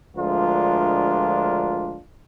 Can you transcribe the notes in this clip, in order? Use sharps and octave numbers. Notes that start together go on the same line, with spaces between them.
D2 F3 G#3 D4 F4 A#4